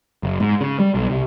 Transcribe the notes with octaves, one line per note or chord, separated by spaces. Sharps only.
F#1
G#2
C#3
G3
B1
C2